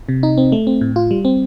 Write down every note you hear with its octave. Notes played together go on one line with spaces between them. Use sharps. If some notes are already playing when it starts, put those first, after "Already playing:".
C3
D#4
C4
A3
C4
A2
F4
G3
C4